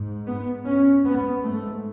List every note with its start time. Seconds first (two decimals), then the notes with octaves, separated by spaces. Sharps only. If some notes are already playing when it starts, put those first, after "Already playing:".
Already playing: G#2
0.26 B3
0.66 C#4
1.05 B3
1.44 G#2 A3